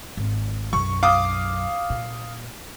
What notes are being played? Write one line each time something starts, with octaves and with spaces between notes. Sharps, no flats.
G#1
B1 F#2 C#6
F5 D6 D#6
A#2